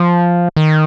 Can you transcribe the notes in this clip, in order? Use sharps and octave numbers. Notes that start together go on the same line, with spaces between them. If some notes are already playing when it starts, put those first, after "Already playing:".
Already playing: F3
D#3